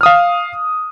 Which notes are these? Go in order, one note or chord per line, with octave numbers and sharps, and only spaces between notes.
F5 D#6 F6